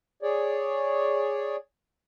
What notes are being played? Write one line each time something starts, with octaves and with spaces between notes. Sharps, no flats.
G#4 C#5 D5